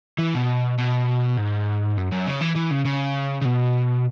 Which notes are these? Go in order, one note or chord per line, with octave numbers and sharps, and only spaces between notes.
E3
B2
B2
G#2
F#2
F#2
C#3
E3
E3
C#3
C#3
C#3
B2